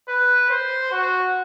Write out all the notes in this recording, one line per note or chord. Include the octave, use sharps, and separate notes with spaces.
B4
C5
F#4